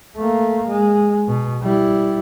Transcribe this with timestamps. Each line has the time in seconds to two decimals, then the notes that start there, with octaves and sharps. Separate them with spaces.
0.17 A3 A#3
0.67 G#3
1.27 B2
1.62 G3 E4